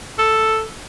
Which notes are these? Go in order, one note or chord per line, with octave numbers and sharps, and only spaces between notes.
A4